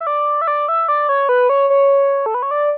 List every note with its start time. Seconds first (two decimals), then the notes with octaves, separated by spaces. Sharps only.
0.01 E5
0.07 D5
0.41 E5
0.47 D5
0.68 E5
0.88 D5
1.09 C#5
1.29 B4
1.49 C#5
1.70 C#5
2.26 A4
2.34 B4
2.43 C#5
2.51 D5